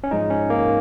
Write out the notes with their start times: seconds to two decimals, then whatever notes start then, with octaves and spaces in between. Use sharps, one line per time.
0.04 C#4
0.11 G#2 F3 G#3 D#4
0.30 C#4
0.50 A#3